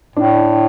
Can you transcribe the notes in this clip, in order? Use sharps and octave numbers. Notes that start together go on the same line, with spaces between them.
A2 D4